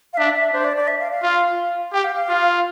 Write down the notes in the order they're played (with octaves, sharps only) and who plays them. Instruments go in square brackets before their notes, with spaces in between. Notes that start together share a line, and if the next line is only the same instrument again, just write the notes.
[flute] F5
[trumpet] D4 [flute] E5
[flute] E5
[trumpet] D4 [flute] C5
[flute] D5
D5
E5
F5
F5
[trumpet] F4
[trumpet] G4 [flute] G5
[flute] F5
F5
[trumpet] F4